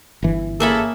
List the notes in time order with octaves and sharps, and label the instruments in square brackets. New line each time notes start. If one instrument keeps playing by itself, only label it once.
[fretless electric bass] G1 E3
[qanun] A#3 E5 B5 [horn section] C#4 G#4 A4